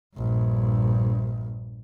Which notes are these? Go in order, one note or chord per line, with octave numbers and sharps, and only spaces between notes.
A#1 G2